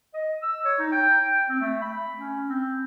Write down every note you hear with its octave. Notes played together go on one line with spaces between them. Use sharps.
D#5
E6
C#5
D#4
G5
G5
C4
A3
B5
C#4
C4